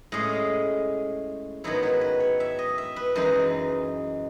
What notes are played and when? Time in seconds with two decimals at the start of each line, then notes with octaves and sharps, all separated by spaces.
0.12 A2 G#3 C#4 D#5
1.64 G#2 D#3 F#3 B3 E4 C#5
1.83 B4
2.01 B4
2.20 C#5
2.40 E5
2.59 D#5
2.78 E5
2.96 B4
3.15 F#2 E3 G#3 D#4